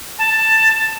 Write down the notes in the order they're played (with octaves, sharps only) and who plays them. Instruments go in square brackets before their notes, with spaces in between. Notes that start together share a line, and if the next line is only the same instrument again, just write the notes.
[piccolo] A5